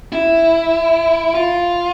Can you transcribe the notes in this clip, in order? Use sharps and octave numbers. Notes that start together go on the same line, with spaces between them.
E4
F4